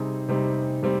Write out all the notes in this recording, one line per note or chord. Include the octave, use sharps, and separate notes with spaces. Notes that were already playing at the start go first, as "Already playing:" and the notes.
Already playing: C3 G3 C4 D#4 G#4 C5
C3 G3 C4 D#4
C3 G3 C4